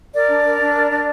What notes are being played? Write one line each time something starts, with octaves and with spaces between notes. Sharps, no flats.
A#4 D5
D4
A#4
D4
A#4
D4